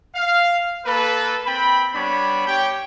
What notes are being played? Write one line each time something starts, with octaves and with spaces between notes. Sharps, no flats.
F5
A#3 A4 B4
C4 G5 B5
G3 B3 D4 C#5 B5
G4 C#5 G5